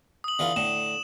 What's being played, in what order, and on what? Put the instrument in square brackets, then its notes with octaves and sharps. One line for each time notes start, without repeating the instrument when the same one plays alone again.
[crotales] D#6 F#7
[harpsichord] D3 E3 F4
[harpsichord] A2 D3 [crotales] E7